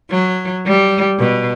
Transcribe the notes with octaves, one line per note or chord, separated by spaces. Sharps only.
F#3
G3
B2